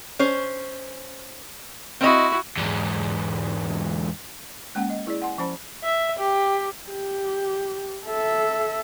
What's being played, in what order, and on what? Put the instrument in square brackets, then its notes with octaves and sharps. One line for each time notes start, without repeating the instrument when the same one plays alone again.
[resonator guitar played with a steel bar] C#4 C5
[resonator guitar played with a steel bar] C4 D#5 [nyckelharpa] E4 F#4
[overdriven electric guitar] E2 G#2
[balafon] G#3 A#3 C#4 F#5
D#5
E4 G#4 D5
F#5 G#5 C6
F3 C#4 C5 A5 B5
[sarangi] E5
G4
[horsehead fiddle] G4
A4 E5